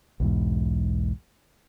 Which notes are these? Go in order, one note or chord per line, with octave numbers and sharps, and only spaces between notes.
B1 E2 G#2